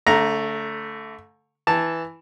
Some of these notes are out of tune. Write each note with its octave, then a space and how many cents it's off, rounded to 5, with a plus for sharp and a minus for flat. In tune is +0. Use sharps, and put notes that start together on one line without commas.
D3 -40 A3 +0 A#5 +0
E3 +0 A5 +0